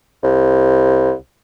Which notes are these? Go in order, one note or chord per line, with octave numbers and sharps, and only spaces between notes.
C2